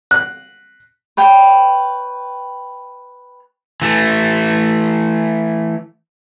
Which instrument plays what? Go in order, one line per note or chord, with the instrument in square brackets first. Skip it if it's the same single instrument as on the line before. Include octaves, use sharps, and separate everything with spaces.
[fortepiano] F#6
[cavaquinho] B4 C#5 G5
[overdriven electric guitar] E3 A3